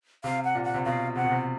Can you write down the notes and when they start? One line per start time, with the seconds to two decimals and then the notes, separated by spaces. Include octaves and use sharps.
0.24 C3 F5
0.44 F#5
0.55 A#2
0.64 F#5
0.74 C3
0.85 B2 F5
1.16 C3 F#5
1.24 B2
1.31 C3